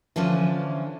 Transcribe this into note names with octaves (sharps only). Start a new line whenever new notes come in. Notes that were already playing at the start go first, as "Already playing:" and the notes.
D3 E3 F3 C#4 F4